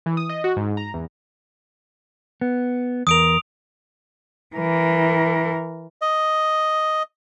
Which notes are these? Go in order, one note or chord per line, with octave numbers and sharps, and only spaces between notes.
E3
D#6
D#5
F#4
G#2
A#5
E2
B3
E2 A#4 D#6 D7 F7
E3 A#4
D#5